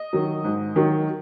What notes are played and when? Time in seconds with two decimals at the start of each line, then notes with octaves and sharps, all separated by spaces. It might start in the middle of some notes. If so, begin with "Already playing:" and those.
Already playing: D#5
0.13 D#3 F#3
0.44 G#2
0.76 D#3 F#3